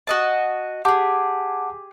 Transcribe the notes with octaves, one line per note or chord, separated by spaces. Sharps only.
F#4 D#5 A5
G4 G#4 F#5 A5 D6